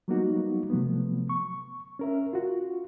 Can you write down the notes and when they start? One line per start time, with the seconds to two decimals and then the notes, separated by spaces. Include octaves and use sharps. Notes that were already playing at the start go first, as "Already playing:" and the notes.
0.08 F#3 G3 A#3 B3 D#4 F#4
0.70 C3 F3 F#3 A3 B3
1.29 C#6
1.99 C#4 A#4 E5
2.33 F4 F#4